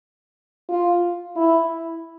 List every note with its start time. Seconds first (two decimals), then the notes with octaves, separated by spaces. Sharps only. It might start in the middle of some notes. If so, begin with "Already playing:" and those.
0.69 F4
1.36 E4